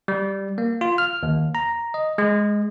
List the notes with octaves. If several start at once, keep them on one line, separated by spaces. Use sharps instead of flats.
G3
A#3
F4
F6
D#2
A#5
D#5
G#3